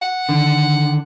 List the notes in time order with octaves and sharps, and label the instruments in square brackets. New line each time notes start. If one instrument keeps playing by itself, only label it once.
[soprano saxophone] F#5
[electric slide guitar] D3 D#3